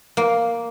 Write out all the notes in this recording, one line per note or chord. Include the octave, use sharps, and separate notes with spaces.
A#3